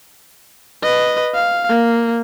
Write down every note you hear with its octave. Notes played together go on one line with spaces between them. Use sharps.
B4 D#5
F5
A#3